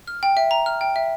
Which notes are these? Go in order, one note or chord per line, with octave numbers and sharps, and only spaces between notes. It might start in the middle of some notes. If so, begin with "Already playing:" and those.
F6
G5
E5
A#5
F6
G5
E5